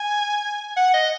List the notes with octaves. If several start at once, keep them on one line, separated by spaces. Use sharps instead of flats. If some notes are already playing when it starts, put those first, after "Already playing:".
Already playing: G#5
F#5
D#5